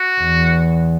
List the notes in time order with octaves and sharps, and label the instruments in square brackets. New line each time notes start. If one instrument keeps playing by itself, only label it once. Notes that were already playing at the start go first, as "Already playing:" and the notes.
Already playing: [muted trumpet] F#4
[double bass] E2